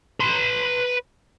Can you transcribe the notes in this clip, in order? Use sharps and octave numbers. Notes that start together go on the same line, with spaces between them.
B4 C6